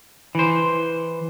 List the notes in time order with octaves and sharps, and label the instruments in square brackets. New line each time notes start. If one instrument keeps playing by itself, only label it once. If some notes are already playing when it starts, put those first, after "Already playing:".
[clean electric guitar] E3 C5